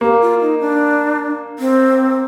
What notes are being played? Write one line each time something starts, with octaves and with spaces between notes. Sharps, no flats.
A#3 G4
F4
D#4
D4
C4